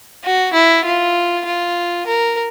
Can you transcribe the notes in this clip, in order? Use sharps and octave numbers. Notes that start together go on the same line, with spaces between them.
F#4
E4
F4
F4
A#4